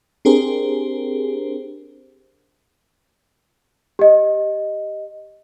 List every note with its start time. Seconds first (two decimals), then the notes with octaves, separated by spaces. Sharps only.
0.25 C4 D4 G4 G#4 A#4 C5
3.99 G4 D#5